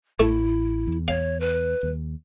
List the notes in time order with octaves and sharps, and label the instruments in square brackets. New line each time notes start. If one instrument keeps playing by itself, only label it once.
[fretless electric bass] A1 [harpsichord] A3 [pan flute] E4
[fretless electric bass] E2
[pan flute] C#5 [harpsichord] F5
[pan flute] B4
[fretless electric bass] D#2